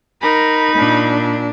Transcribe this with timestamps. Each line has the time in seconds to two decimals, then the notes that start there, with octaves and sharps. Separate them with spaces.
0.22 D#4 A#4 B5
0.75 A#2 D4